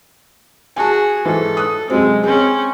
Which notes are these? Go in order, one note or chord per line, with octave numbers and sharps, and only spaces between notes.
F#4 G#4 G#5 A5
G#2 E3 A4
D#6 F#6
F#2 C3 G#3 C4
C4 C#4 G#4